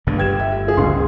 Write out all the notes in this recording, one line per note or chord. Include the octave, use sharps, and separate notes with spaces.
G1 G2 D3 A3 B3 D4
G4 B4 G5 G#6 E7
E5
F4 G#4
F#1 C#2 A2 F3 C6